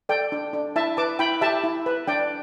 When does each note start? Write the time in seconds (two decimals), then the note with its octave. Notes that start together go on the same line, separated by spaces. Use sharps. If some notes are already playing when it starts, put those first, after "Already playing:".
0.09 A4 D5 G5
0.32 D4
0.53 D4
0.76 E4 E5 A5
0.97 B4 A5 D6
1.19 E4 G5 B5
1.41 G4 E5 A5
1.64 E4
1.86 B4
2.07 D4 D5 G5